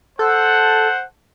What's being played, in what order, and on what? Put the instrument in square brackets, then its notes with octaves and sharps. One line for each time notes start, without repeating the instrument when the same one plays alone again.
[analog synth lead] A4 [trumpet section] C5 F#5